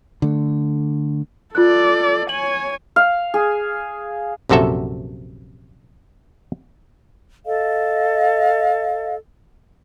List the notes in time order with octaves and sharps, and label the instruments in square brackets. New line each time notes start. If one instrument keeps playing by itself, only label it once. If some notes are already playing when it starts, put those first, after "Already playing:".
[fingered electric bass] D3 A3
[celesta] F4 F#6 [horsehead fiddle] A4 D5
[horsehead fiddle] C#5 G#5 [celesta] F#7
[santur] F5
G#4
[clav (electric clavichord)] A#1 F#2 C3 F#4 A4 E5
[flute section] A4 D#5 F5